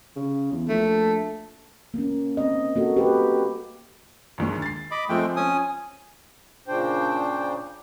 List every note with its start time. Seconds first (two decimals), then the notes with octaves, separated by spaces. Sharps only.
0.16 C#3
0.52 E2
0.69 A#1 A3
1.94 A#3 C#4
2.37 C4 D#5
2.76 A#3 F#4 A4
2.97 G4 B4
4.38 A#1 D#2 G#3
4.62 A6 C7
4.91 D#5 B5 D6
5.09 F3 G#3 A3 C4 G5
5.36 C#4 G#5 D#6
6.68 A#2 C#3 D4 C5 G5